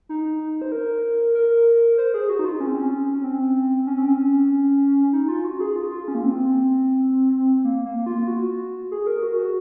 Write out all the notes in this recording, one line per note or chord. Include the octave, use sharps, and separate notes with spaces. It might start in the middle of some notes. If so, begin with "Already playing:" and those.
D#4
C5
A#4
A#4
C5
G#4
F#4
D#4
F4
C#4
C4
C#4
C#4
C4
C#4
C4
C#4
D#4
F4
F#4
G#4
F4
F4
C#4
A#3
C4
A#3
A#3
F4
F#4
G#4
A#4
F#4
F#4